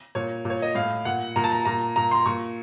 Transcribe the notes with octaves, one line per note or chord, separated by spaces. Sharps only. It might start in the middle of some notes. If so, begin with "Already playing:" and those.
A#2 C#5
A#2
C#5
D#5
A2 F5
A#2 F#5
A#2 A#5
A5
A#5
A#2 A#5
A#2 A#5
C6
A#2 C#6